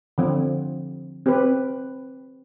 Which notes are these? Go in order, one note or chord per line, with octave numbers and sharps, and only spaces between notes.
D3 F3 C4
C4 G4 B4